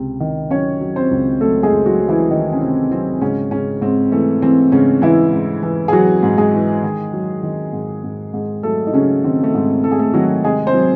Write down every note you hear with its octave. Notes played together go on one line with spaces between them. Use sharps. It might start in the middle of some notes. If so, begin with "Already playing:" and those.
Already playing: C#2 C3
D#3
F#3 C#4 C#5
F#3
C4 C5
C#2
F#3 A3 A4
G#3 G#4
C#2
F#3 F#4
F#3
E3 E4
D#3 D#4
C#4
C3 C4
F#3 C4
G#2 C#3 C#4
G#2 C#3 C#4
G#2 C4
E3 A3
E3 C4
G#2 C#3 C#4
G#2 E3 E4
G#2
E3
G#4
E3 F#3 F#4
G#2
G#3 G#4
E3
D#3
F#3
D#3
G#2
G#2
G#2
F#3 A3 A4
D#4
C#3 F#3 C#4
D#3 C4
A3
G#2 C4
G#2 A4
G#4
A3 A4
D#3 F#3 F#4
C3 G#3 G#4
C4 C5
F#3